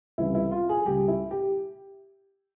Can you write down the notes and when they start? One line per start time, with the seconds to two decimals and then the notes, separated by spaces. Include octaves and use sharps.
0.18 C#2 C3 E3 G3 E4
0.35 E4
0.51 F4
0.69 G#4
0.86 C#2 C#3 G3 G4
1.08 E4
1.31 G4